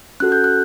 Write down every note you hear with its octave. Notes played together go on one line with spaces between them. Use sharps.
C#4 F#4 A4 F#6
G6
F#6